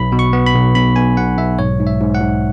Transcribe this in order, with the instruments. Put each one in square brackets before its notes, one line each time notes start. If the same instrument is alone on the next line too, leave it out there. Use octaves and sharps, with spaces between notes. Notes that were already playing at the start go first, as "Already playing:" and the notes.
Already playing: [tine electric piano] B1 B5
B2
C#6
B3
B5
B1
B1 B5
B1 G#5
B1 F#5
B1 E5
G#2 C#5
G#2
E5
G#2
F#5
G#2